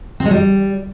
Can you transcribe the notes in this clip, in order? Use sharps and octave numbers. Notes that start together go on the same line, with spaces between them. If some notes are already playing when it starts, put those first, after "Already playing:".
C4
G#3
G3